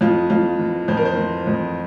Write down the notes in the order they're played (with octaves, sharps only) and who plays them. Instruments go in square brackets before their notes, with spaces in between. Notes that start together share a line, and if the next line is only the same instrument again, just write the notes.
[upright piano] F2 F4
F2 F4
E3
F2 C5
A#4
C5
E3
F2